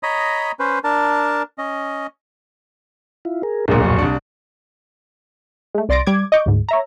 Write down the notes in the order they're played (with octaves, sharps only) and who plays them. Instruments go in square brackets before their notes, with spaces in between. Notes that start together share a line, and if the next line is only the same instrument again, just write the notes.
[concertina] C#5 D#5 A#5 B5 D#6
C#4 B4 C5
D4 A#4 A5
C#4 D#5
[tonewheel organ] E4 F4
G#4 A#4
[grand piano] D1 B1 A#2 [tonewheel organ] D4 G#4 A#4
[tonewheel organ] F2 F#3 C#6
[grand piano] C2 D4
[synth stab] G#3 A3
C2 D5 C6 A6 A#6 D7
G3 D6 G#6
D#5 C#6 D6 G6
D2 G#2
C#5 E5 A#5